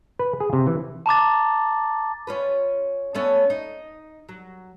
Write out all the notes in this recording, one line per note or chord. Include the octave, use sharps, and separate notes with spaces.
B4
G#4
C3
E3
A5 A#5 D6 A6
C#4 F4 B4
A3 B3 C#4
D#4
F#3